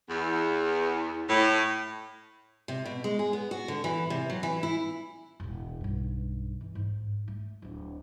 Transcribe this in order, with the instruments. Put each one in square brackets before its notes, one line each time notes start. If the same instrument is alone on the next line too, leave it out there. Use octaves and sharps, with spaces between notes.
[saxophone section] E2
A2
[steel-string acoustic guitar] C3
B2
G#3
G#4
B3
F#4
D3
E3
C3
F#3
E3
E4
[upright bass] E1 A1
B1 G2
E3
G#2
A3
D1 D4